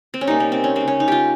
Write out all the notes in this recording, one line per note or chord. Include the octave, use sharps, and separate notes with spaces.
C4
C#4
C3 G3 A#3 D#4
C#4
C4
C#4
C#3 G#3 C4
C#4
D#4
F4 G4